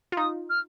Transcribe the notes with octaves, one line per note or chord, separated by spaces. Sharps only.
F4
D#4 D#6
F6